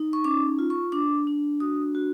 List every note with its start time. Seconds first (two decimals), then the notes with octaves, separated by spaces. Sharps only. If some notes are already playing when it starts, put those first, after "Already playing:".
Already playing: D#4
0.13 C#6
0.24 C#4 D6
0.59 F4
0.70 C#6
0.92 D4 D6
1.27 D4
1.60 F#4 D#6
1.95 F#4